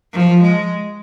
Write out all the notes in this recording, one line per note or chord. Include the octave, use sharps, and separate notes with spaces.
F3
G#3